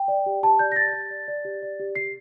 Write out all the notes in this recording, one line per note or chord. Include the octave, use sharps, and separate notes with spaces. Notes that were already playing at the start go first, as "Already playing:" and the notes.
Already playing: G5
D5
G4
G4 A5
D5 G6
A#6
G4 A6
G4
D5
D5
G4
D5
G4
G4 C7